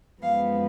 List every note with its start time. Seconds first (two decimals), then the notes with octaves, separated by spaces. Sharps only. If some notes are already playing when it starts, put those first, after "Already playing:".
0.22 F#2 F3 G#3 B3 F5